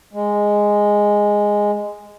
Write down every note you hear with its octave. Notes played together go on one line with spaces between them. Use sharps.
G#3